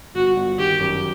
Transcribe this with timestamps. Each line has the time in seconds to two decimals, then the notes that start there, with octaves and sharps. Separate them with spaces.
0.15 G1 F#4
0.37 G1
0.59 D#3 G4
0.80 F#2